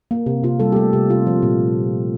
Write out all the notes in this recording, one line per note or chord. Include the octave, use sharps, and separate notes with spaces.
A#3
C3
C3 F4
G3 A4
G4
A3 A4
C3 G4
C3 F4
F3
A#2